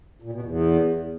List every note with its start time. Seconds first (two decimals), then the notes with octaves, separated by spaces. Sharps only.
0.22 A#2
0.32 B2
0.42 E2